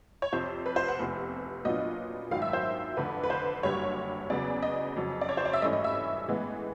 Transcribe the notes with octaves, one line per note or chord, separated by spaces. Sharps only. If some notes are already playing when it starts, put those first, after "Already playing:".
C#5
F2 C3 F3 C5
B4
C5
F#5
F1 E2 C3
A#2 F#3 B3 D4 F4 D#5
G#1 F#2 D#3 F#3 F5
E5
C5
F1 F2 D3 B4
B4
C5
F#1 F#2 D3 G3 C#5
E2 C#3 F#3 B3 D5
D#5
F2 C#3 F#3
D5
C#5
C5
D5
E5
G#1 G2 E3 A3 C#4 D#5
D#5
E5
A2 E3 G#3 B3